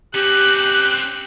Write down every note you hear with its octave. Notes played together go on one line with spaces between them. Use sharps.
C4 C#4 G4 F#6